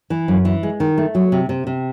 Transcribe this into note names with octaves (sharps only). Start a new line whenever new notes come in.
E3
F#2
E3
G#3
D#3
A3
F#3
C3
C3
C3